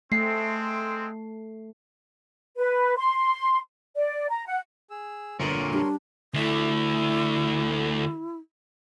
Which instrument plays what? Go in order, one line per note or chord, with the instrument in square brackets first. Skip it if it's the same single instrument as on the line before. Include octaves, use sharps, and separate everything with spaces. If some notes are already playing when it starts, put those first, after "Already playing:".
[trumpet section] G#3 C4 [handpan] A3 [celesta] C7
[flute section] B4
C6
D5
A#5
F#5
[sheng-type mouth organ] G#4 E6
[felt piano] G1 [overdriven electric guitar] A#2 D3 [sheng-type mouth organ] A#4 C#5 C6
[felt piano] G3 [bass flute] D4
[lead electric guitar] D2 A3 [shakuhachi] E4